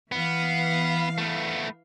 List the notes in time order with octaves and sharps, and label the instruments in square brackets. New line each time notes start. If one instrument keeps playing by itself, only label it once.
[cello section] E3 F5 [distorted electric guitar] B3
[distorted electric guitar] A3 B3